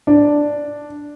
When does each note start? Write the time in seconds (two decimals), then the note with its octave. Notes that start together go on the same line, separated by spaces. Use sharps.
0.07 D4